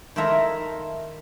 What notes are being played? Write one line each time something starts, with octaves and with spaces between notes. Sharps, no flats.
D#3 E4 F4 A4 E5 A#5